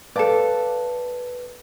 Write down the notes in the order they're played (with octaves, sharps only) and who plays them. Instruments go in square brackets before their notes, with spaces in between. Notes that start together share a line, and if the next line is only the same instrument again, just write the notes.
[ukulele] A4 D5 [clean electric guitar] B4 F5 A5